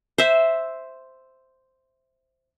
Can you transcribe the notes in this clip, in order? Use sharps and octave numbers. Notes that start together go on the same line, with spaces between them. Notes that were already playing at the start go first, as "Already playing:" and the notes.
C5 E5